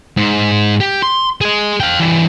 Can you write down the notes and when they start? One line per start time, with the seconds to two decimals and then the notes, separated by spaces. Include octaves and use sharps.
0.17 G#2
0.80 G4
1.02 C6
1.41 G#4 D#5
1.80 F5 G5
2.00 E3 G3